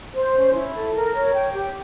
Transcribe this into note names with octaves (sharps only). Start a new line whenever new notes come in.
C5
C#4
E4
A4
A#4
C#5
G5
G4